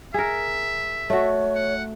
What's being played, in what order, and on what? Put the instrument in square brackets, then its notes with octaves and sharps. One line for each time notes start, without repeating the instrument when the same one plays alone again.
[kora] G#4 A#4 [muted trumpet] E5
[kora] A3 F#4 [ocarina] C#5
[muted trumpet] F#5